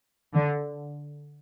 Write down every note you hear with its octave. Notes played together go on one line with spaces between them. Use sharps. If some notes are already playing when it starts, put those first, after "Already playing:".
D3